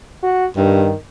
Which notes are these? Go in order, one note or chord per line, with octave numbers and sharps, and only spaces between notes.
F#4
G2 D#3